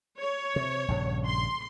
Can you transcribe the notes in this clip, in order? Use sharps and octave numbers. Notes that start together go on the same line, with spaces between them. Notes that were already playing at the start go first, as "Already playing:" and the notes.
C#5
C3
A#1 G2 C#3
C6